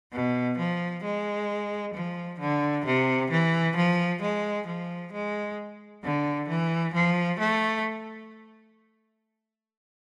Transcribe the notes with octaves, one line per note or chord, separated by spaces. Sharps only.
B2
F3
G#3
F3
D3
C3
E3
F3
G#3
F3
G#3
D3
E3
F3
A3